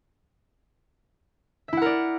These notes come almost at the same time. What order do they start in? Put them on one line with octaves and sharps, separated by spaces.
E5 E4 F#5 A#4 D5